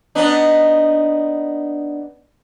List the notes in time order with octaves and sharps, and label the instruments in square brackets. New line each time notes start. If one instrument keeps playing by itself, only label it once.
[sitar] B3 D4 D#4